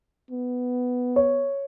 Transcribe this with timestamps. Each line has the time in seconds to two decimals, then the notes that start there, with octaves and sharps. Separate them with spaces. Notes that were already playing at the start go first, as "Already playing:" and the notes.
0.31 B3
1.16 C#5